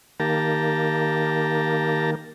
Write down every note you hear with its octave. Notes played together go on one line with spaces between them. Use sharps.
D#3 A#3 G4 A5 A#5